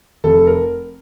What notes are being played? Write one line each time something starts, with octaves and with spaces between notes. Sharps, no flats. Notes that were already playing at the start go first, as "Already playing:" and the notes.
F1 A4
A#4